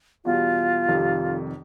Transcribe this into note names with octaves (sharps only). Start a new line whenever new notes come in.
E2 B2 G3 F4
F1 F2 C3 D#3 G3